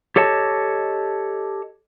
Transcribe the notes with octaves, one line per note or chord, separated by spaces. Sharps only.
G4 A4 C#5 D#5 A5